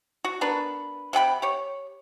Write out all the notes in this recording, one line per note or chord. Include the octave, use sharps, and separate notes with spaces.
F#4
B3 D4 A#4 B4
C3 F#5 G5 B5
G4 C#5